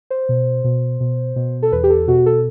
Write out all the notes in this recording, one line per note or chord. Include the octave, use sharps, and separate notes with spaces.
C5
B2
B2
B2
B2
A4
E2 B4
G4
A4
B2 F#4
A4